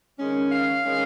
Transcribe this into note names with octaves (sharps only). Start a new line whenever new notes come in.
D#3 G#3 C#4
F5
D#3 G#3 C#4